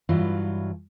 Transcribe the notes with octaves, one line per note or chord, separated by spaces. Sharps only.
G2 E3 F#3 F4